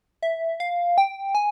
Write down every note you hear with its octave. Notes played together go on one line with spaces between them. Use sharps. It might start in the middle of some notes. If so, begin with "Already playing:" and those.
E5
F5
G5
G#5